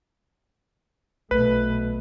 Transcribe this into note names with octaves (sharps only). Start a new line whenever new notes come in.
B1 B2 A3 B4